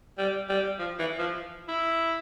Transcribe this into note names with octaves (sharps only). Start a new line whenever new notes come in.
G3
G3
F3
E3
F3
E4